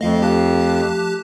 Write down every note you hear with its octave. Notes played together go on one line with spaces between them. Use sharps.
F2 F3 A3 D#5 F5
G4 F5 A5 F#6